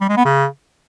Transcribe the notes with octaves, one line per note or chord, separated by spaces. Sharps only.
G3
G#3
B3
C#3